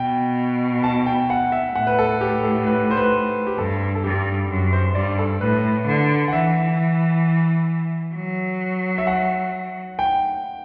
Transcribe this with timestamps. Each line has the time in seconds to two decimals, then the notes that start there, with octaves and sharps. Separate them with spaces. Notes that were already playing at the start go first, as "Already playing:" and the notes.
Already playing: B2 G5
0.84 A5
1.06 G5
1.30 F#5
1.52 E5
1.75 A2 F#5
1.87 B4
1.99 A4
2.21 G4
2.43 A4
2.67 B4
2.91 C5
2.97 B4
3.47 G4
3.58 G2 A4
3.95 A4
4.03 G2 G4
4.50 F#2
4.73 C5
4.95 G2 D5
5.19 A4
5.41 A2 B4
5.87 D3
6.28 F#5
6.32 E3 E5
8.15 F#3
8.98 E5
9.07 F#5
9.99 G5